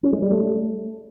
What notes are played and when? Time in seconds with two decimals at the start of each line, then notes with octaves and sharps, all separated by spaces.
0.03 C#4
0.13 G#3
0.22 G3
0.32 A3